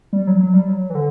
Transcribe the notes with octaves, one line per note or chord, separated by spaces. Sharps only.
G3
F#3
F#3
G3
F#3
E3
D3